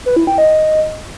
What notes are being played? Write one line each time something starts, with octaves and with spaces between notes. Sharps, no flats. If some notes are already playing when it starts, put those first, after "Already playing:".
B4
E4
G5
D#5